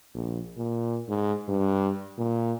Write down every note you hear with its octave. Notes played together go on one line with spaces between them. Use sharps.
A#1
A#2
G#2
G2
A#2